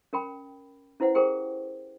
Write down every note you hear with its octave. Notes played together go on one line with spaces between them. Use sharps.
C#4 A#4 G5 B5
C#4 E4 B4 C5 F#5
G4 G#4 A#4 C5 G5